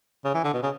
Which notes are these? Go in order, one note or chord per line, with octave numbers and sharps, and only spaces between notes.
C#3
E3
D3
B2
C#3